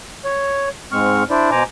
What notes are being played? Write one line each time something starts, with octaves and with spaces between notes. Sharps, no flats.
C#5
G#2 G#3 C4 C#6 F6
D4 E4 C5 D5
B2 C5 G#5 A#5 D6